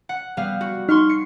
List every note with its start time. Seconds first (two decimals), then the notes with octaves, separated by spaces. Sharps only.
0.09 F#5
0.37 G3 B3 F5
0.61 F#4
0.89 D#4 C6 C#6 F6
1.09 C7 C#7